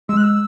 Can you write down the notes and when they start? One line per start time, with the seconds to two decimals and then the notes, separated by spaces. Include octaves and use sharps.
0.09 G#3 E6
0.17 F#6
0.24 E6